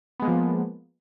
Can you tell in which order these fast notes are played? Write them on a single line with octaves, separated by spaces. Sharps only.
B3 G#3 A#3 F3